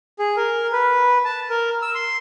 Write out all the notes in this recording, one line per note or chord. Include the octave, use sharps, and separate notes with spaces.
G#4
A#4
B4
A5
A#4
E6
C6